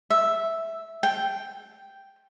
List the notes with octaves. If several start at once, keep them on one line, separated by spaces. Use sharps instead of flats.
E5
G5